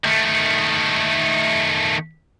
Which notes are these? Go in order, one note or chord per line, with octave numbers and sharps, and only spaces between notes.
D#3 A3